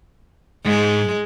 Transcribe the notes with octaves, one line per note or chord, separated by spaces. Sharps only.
G#2 G#3